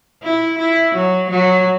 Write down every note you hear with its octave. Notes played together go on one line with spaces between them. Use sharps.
E4
E4
F#3
F#3